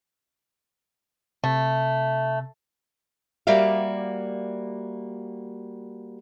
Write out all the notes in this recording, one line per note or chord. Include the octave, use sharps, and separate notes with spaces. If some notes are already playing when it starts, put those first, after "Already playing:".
C3 A3
G3 A#3 F#4 D5 E5 F5